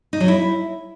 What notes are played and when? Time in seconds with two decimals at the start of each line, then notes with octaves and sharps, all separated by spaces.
0.13 D#4
0.20 F#3
0.28 E4